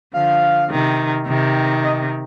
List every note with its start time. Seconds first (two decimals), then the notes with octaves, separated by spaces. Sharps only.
0.14 D3 F3 F5
0.70 C3 D#3
1.27 C3 D#3
1.83 D#5